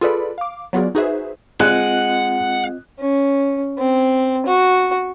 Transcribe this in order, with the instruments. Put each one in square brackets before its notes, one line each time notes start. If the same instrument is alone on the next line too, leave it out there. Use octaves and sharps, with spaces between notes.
[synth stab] F4 G#4 A4 B4 D5 B5
F5 D6
F#3 B3 F4 F#4 G#4 D5
D#4 F#4 G#4 B4 C5 E5
[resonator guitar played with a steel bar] G#3 [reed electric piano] C4 F4 D#5 [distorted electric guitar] F#5 [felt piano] F#6
[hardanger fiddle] C#4
C4
F#4